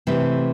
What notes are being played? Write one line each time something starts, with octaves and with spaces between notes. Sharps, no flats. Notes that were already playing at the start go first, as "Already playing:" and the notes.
C3 E3 A3